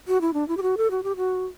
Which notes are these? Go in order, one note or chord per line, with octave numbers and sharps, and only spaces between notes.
F#4
E4
D4
E4
G4
F#4
A4
F#4
G4
F#4